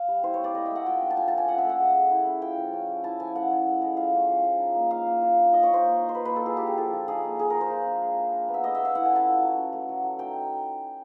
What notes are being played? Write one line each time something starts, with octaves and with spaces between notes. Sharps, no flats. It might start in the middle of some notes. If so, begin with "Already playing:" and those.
Already playing: F5
G3
E4 C5
C#5
C4 D5
A3 D#5
A3 E5
F#5
F4 G5
D4
A5
F4 G#5
A5
F3 G#5
C#4 F#5
E5
A3
F#5
G#3
G#3
E4
C#4
F4 G5
F3
C#4
A3
E4 A5
F3 G#5
C#4 F#5
A3
G#3
G#3
F4 F5
C#4
F3
F3
D#4
A#3
A#3 F5
A#3
F4
D4
D#4 D#5
A#3 C#5
C5
A#3
D#4
C5
A#3 B4
A#3 B4
A4
F4 G#4
G4
D4
G#4
F3 A4
F3
D#4 G#4
A#3
A#3 G#4
A#3 A#4
C5
F4
D4
G#3
G#3
D4
B3
E5
A3 D#5
A3 E5
F5
E4 F#5
C#4 G#5
A5
F4
F#3
C#4
A3
F#3
F#3
D#4 G5